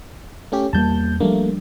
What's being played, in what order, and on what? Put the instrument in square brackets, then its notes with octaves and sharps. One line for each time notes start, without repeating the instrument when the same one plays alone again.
[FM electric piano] A3 C#4 G4
[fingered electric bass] E2 G3 A#3 [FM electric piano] A5 G6
[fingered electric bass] F3 G3 D4 [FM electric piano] A3 A#3